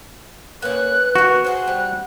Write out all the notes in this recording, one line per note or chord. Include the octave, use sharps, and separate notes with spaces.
A#3 C#4 B4 F#6
B3 F#4 A#4
G#4 C5 F#5 F#6
G3